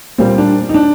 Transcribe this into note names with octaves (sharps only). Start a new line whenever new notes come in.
A#2 G3 A#3 C4
D4
D#4
D4